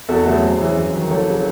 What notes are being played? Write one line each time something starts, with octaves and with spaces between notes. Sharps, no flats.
E2 F#4 A4
C#3 F#3 A3 F#4 A4
F#2 G#4 C5
C#3 E3
F#2
D#3 F#3
F#1 A4 C#5
C#3 F#3